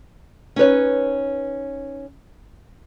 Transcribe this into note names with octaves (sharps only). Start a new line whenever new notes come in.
C#4 D#4 B4 C#5